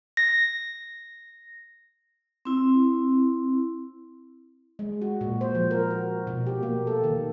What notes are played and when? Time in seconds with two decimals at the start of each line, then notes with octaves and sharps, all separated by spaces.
0.17 A#6
2.45 C4 E4
4.79 G#3
5.02 F#4
5.21 A#2
5.41 C5
5.55 F3
5.71 A#4
5.90 F#4
6.27 B2
6.46 G4
6.63 A#3
6.87 A4
7.04 D#3